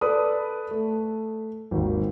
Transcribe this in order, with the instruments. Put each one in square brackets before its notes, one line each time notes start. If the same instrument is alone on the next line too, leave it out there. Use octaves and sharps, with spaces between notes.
[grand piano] A4 B4 D5 B5 D#6
A3
G#1 D#2